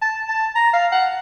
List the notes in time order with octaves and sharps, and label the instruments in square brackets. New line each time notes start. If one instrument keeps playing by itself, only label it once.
[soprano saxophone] A5
A5
A#5
F5
F#5